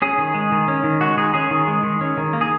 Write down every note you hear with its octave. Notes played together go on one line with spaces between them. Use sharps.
C#4 G#4
D#3
G#3
D#3
C#4
D#3
G#3 F#4
D#3 G#4
C#4 G#4
D#3
G#3
D#3
C#4
D#3
A#3
G#4